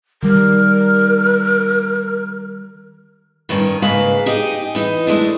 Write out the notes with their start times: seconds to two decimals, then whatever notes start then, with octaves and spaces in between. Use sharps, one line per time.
0.23 D#3 G3 A#4
3.49 G2 D#3 C#4
3.82 G#2 C#3 A#3 B4 F5
4.26 D#4 G4 G#4
4.75 E3 D#4
5.07 G#3 A3 D4